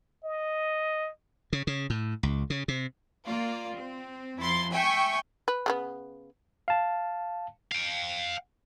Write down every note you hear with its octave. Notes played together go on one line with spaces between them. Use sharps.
D#5
C#3
C#3
A2
C#2
C#3
C3
A#3 F4 D5
C4
F2 E4 C6 A6
E5 G5 G#5 C#6
B4
C#3 A3 B3
F5 A5
F5 G5